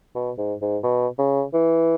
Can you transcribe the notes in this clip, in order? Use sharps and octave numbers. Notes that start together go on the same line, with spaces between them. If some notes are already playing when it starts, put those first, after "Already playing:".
B2
G#2
G#2
B2
C#3
E3